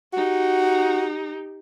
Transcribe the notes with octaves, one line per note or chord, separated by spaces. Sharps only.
D#4 F#4 G4